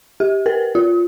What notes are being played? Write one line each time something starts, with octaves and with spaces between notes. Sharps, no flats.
G4
A#4 B4
F4